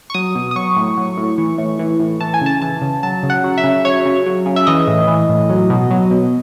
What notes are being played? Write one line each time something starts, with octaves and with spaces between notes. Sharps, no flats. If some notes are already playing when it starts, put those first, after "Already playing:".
C#6
F#3 D#6
B2
D#6
F#3 C#6
A2
F#3
A2
E3
A2
E3
A2
E3 A5
G#5
C#3 A5
E3 A5
C#3
F#3 A5
C#3
F#5
F#3
E5
C#3
F#3 C#5
C#3
F#3
C#3
E5
E3 D#5
A2
E3
A2
F#3
B2
F#3
B2